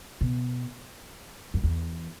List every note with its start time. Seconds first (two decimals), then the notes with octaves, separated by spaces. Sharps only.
0.21 B2
1.54 F#2
1.63 E2